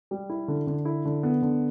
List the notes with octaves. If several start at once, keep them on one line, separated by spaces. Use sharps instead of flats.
G3
E4
D3
D3
E4
D3
B3
D3